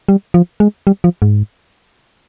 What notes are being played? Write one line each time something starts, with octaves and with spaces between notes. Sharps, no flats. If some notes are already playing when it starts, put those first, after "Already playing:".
G3
F3
G#3
G3
F3
G#2